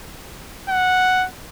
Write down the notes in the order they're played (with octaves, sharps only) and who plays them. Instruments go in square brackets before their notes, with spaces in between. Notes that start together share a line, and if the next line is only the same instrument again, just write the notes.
[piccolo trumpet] F#5